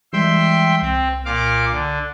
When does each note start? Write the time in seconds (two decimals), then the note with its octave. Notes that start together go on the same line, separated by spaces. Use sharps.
0.13 E3 G3 G#3 E5 G5 C6
0.82 C2 C4
1.25 A#2 F5 D6
1.72 D3